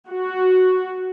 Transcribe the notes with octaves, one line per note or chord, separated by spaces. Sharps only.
F#4